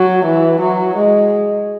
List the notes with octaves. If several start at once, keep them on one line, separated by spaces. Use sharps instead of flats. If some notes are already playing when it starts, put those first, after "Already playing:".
Already playing: F#3
E3
F#3
G#3